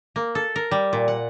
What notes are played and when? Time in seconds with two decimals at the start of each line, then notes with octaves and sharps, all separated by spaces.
0.16 A#3
0.35 A4
0.56 A#4
0.71 G3
0.93 A#2
1.08 F#5